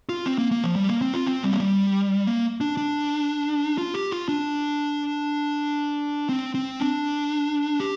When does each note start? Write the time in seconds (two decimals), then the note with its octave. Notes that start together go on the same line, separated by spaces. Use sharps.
0.09 F4
0.26 C4
0.38 A#3
0.51 A#3
0.64 F3
0.76 G3
0.89 A#3
1.02 C4
1.14 F4
1.27 C4
1.43 G3
1.52 A#3
1.60 G3
2.27 A#3
2.61 D4
2.77 D4
3.78 F4
3.94 G4
4.11 F4
4.28 D4
6.29 C4
6.55 C4
6.80 D4
7.80 G4